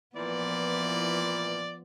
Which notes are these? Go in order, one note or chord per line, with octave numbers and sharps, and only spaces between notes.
A#2 E3 F3 B3 D5